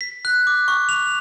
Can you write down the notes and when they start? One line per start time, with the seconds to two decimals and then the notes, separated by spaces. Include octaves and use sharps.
0.01 B6
0.25 F#6
0.47 D6
0.68 C#6
0.89 F7